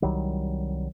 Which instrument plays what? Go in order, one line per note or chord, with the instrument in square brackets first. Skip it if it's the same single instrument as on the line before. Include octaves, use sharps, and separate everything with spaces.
[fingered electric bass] C2 D#3 F#3 G3